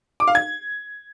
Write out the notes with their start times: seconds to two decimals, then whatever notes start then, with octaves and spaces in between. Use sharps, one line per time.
0.20 D6
0.27 F5
0.35 G#6